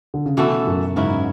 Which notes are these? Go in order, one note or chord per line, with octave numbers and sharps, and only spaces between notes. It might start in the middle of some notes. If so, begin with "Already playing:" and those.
D3
C#3
B2 E3 A3 C#4 F#4 A4
F#2
G#2 C#3 F#3 C#4 E4